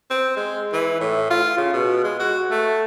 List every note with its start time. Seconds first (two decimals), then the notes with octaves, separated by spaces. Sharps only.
0.10 C4
0.37 G#3
0.73 E3
1.00 A2
1.30 F4
1.57 C#3
1.73 B2
2.04 G#3
2.20 F#4
2.51 A3